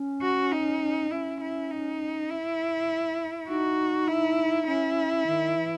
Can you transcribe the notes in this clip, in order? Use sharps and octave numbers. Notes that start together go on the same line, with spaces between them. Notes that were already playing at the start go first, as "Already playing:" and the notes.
Already playing: C#4
F#4
D#4
C#4 E4
E4
D#4
E4
D#4 F#4
E4
C#4 E4
D#3
E3